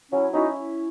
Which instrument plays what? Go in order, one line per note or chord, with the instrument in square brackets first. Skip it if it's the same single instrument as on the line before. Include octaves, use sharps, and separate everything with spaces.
[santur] F#3 [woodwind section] C#4 E4
[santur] C#4 E4 [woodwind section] D#4 F#4